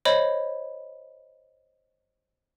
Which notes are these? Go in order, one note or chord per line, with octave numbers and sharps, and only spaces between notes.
C5 C#5 D#5 B5